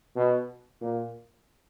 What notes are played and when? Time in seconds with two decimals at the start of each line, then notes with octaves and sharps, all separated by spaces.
0.16 B2
0.81 A#2